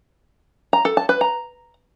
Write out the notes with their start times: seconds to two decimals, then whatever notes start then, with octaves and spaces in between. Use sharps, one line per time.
0.73 A#5
0.85 A4
0.97 A5
1.09 B4
1.21 A#5